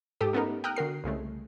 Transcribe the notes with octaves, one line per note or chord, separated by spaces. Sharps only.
G#2 G4 A4 D#6
A3 B3 C#4 D#4 A#4
G5 A#5 D#6 F6 F#6
D3 F#4 A#4 C7
C2 C#3 G#3 A3